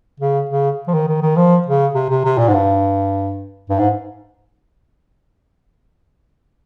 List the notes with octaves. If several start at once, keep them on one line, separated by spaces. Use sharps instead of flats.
C#3
C#3
F3
D#3
D#3
D#3
F3
C#3
C3
C3
C3
A#2
G#2
G2
G2
G#2